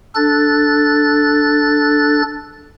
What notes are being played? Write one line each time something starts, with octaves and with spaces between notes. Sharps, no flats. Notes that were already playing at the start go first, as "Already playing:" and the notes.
D4 A4 F#6 A6